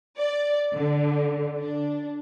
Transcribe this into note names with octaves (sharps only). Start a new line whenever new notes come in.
D5
D3
D4